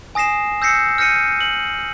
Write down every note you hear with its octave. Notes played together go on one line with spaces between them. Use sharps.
G#5 D#6 A#6 C7 E7
E6 G6 A#6 C7 C#7
F6 G6 A#6 C#7 D#7
F#7